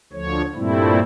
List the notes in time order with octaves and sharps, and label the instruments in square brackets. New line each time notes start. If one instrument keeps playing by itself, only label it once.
[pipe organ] D2 D3 F3 C#5
G2 A#2 G3 A3 C4 E4